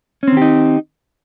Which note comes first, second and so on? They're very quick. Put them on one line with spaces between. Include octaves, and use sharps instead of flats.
C#4 C4 D#3 G4 D#4